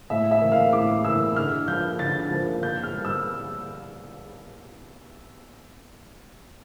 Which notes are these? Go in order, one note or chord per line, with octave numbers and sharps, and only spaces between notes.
A2 E5
E5
E3 A#3
F5
A2 D6
E3 A#3 E6
D3 F6
F3 A#3 G6
D3 A6
F3 A#3
A#2 G6
F6
G3 A#3
E6